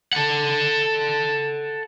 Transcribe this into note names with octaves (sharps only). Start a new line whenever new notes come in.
A4 F#5